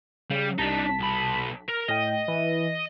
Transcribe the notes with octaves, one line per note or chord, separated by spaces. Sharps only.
C#3 G3
C2 D4 D#4 A5 B6
B1 B5
A#4 F6
A2 D#5 G5
E3